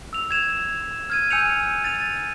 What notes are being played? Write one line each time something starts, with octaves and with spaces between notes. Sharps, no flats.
E6 F7
G#6 E7 F7
F6 G#6 D#7
G#5 E6 G6 C#7 D#7 F7
A6 D#7 F7